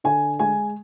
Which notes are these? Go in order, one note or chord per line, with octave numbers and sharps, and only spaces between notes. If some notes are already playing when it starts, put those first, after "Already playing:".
D3 G#5
G#3 G#5